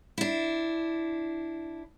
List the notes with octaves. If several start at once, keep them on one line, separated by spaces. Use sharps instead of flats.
D4 E4